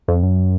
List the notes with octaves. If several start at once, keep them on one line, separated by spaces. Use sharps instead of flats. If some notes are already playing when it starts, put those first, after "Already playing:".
F2
F#2